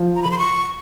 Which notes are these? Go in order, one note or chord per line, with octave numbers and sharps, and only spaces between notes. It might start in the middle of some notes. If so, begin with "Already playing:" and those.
Already playing: F3
A#5
B5
C6
C#6